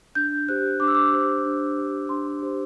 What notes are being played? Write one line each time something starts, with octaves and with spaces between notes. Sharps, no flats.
D4 G6
G4 C5 F#6
D4 D6
E6
D6
G4 C5
D4
G4 C5
D4 C6
G4 C5